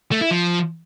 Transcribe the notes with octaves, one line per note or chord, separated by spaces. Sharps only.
A3
E4
F3